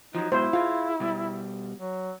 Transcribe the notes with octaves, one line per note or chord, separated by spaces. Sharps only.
F3 F#3 D#4
G#2 B2 F#3 E4 C5
F4 G#4 F5
B2 G3
F#3